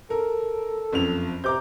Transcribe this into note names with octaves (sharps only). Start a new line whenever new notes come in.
A4 A#4
F#1 F2 F7
C3 A#5 D6 G6